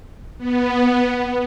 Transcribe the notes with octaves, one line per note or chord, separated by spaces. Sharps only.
B3